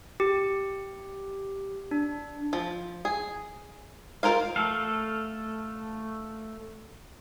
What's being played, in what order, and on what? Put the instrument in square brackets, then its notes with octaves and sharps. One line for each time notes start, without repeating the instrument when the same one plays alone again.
[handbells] G4
D4
[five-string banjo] F3
G#4
F4 A4 A#4 C5 F5
[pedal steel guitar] A3 A4 F5